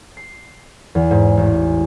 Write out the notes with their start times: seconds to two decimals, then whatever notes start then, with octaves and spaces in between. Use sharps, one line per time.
0.17 C7
0.95 E2
1.11 G#2
1.37 A1